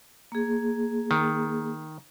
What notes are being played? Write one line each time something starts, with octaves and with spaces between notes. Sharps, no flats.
A#3 G#4
D#3